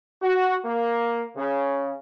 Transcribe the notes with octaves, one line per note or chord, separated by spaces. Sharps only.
F#4
A#3
C#3